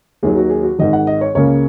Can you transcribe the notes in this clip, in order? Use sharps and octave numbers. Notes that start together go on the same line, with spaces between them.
D#2 D#3 F#3 G#4
F#4
G#4
F#4
G#1 G#2 D#3 D#5
F#5
D#5
C#5
C#2 C#3 A#3 C#4 C#5